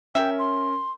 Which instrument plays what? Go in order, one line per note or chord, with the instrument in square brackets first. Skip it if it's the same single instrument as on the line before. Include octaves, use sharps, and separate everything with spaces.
[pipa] F#3 E5 [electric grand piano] C#4 A#4 [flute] G5
[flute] C6